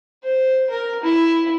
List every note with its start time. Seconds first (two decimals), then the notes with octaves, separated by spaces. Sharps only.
0.23 C5
0.70 A#4
1.04 E4